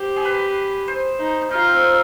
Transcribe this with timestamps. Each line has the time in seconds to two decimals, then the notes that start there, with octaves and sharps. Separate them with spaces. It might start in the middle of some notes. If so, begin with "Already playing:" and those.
Already playing: G4 C5
0.16 G#4
0.25 B4
0.88 C5
1.19 D#4
1.51 D#4 F4
1.68 C4
1.83 C4